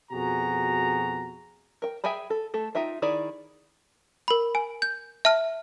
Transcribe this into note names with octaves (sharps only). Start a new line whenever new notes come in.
F2 B2 F#4 G#4 A#5
A#4 G5
G#4 E5 G5 G#5 B5
A4
A3 A4
D#4 F4 E5 G5
D#3 E4 G#4 D5
A#4 B5
G#5
G6
E5 A5 F6